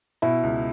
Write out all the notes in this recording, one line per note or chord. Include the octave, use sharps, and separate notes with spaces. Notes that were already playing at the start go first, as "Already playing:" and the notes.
B2 E4
C#2